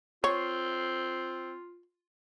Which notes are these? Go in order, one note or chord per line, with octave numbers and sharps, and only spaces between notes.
C4 F4 C#5